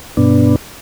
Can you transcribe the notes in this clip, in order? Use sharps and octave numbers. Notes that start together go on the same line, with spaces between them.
G2 B2 B3 D4